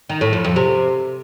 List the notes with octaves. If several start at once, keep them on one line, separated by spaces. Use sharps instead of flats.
D#3
A2
F2
F2
C3